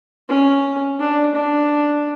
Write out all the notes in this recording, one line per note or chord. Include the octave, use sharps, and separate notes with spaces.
C#4
D4
D4